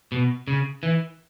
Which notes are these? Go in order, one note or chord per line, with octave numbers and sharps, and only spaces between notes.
B2
C#3
E3